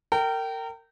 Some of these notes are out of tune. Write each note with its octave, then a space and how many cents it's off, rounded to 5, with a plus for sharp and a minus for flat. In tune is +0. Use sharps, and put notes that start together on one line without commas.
A#4 -30 G5 -20